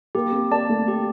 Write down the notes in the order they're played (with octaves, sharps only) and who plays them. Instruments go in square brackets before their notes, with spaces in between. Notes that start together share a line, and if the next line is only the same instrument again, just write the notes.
[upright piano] A#3 [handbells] G4
[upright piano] C4
[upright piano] A#3 [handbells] D5 A5
[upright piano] A3
[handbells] G4